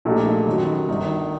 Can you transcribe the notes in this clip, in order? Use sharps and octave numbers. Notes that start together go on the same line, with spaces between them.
A#1 A#2 A3 D#4 G4
F#2 D#3 F#3
G1 G2 D#3